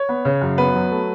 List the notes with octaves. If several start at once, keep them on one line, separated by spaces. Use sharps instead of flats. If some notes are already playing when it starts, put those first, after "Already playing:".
Already playing: C#5
B3
C#3
F#2
B3 B4
F#3
A3